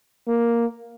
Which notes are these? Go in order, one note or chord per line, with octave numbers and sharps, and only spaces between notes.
A#3